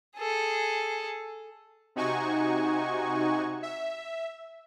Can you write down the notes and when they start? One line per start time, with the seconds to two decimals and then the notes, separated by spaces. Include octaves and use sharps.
0.17 G#4 A4
1.96 C3 D#4 F#4 G#5 C#6
3.63 E5